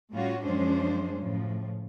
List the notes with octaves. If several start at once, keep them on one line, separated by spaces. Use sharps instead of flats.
A2 G3 C#4 F4 F#4
F#2 F3 G#3 C#4 D4 C5
A2 C#3 F3